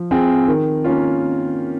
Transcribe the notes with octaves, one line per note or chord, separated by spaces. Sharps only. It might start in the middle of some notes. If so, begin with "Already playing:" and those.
Already playing: F3
C4 F4 G#4
D#3
A#3 C#4 F4